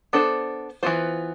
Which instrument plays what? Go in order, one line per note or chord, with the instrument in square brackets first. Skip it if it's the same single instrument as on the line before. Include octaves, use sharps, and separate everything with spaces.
[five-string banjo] B3 D4 A4 C5
E3 B3 F4 C5